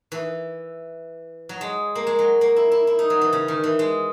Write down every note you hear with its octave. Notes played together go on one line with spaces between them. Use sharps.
E3
F#3
G#3
A#3
G#3
F#3
A#3
E4
E4
E4
D#4
F#3
E3
C#3
D#3
E3
G#3